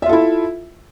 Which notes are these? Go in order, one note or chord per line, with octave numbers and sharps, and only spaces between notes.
E4 F4 A4 E5